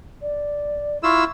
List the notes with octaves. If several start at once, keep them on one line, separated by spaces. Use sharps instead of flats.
D5
E4 F4 C#6 E6